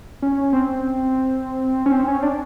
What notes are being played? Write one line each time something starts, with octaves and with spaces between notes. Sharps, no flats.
C#4
C4
C#4
C4
C#4
D4